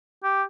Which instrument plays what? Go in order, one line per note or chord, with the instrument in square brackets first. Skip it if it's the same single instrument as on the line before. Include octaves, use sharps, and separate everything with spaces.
[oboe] G4